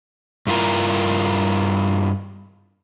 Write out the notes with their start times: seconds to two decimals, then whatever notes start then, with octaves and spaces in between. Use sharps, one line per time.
0.47 G2 E4 F4 A#4